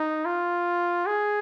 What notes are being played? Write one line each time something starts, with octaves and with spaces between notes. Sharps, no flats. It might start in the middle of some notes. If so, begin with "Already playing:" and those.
Already playing: D#4
F4
G#4